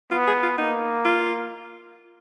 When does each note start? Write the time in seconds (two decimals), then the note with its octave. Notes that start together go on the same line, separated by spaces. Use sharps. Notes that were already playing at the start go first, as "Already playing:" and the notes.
0.11 B3 F4
0.27 G#4
0.43 F4
0.58 A#3 D#4
1.05 F4